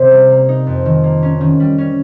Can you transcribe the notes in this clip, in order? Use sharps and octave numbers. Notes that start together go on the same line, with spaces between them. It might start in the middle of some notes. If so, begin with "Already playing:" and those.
Already playing: C3 C4
G3
A#3
D#4
F2
D#3
A#3
C#4
D#3
G3
C#4